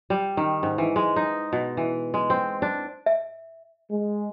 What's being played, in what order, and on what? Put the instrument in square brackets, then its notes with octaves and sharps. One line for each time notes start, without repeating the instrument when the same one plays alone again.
[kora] G3
D#3
G#2
E3
G#3
D#4
B2
E3
G#3
C4
D4
[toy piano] E5
[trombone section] G#3